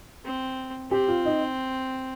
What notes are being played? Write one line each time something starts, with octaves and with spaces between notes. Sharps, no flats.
C4
C4 G4
F4
D#4